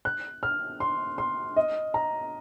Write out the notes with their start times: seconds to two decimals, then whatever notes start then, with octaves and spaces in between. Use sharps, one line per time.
0.05 F#6
0.43 F6
0.80 C6
1.18 C6
1.56 D#5
1.94 A#5